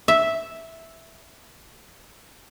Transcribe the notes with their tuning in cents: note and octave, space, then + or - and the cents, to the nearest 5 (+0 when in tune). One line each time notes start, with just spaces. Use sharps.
E5 -5